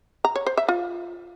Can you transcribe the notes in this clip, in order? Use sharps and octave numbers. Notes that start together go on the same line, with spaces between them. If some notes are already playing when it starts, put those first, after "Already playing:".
A#5
C#5
C5
E5
F4